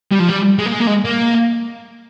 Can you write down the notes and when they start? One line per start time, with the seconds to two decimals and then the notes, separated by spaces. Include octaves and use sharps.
0.12 G3
0.20 F3
0.28 G3
0.59 G#3
0.66 A#3
0.73 G#3
0.80 A#3
0.87 G#3
1.05 A#3